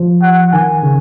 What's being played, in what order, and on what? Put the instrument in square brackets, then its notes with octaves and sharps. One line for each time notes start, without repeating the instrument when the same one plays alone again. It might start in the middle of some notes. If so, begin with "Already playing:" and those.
Already playing: [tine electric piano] F3
[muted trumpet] F#5
[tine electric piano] D#3 [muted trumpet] G#5
[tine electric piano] C#3